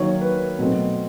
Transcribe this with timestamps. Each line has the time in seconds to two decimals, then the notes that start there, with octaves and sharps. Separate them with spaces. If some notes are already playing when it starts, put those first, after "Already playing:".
Already playing: D#3 F#3 A#3 C#5
0.22 B4
0.59 B2 F#3 A3 C4